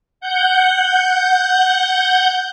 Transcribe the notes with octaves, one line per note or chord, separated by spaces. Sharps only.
F#5 G6